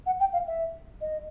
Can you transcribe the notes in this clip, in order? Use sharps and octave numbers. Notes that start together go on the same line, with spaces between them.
F#5
G5
F5
E5
D#5